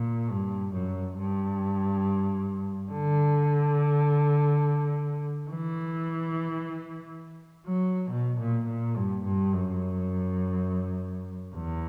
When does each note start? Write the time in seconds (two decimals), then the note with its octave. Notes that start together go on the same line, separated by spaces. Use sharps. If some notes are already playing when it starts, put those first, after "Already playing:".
Already playing: A#2
0.30 G2
0.74 F#2
1.17 G2
2.91 D3
5.50 E3
7.66 F#3
8.10 B2
8.39 A#2
8.67 A#2
8.96 G2
9.24 G2
9.53 F#2
11.56 E2